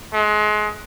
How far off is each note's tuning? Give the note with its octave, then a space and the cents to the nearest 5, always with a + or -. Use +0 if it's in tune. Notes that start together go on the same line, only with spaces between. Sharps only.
G#3 +30